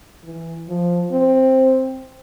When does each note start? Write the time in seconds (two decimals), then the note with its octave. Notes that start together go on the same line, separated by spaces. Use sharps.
0.24 E3
0.69 F3
1.12 C4